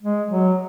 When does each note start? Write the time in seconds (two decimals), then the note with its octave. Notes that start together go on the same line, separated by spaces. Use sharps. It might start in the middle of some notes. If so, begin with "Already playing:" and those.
0.02 G#3
0.31 F#3